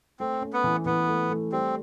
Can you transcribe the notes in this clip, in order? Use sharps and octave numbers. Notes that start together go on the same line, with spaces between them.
A3 C4
C#4
B3
E3
E3 B3
A3
A3
G3 C4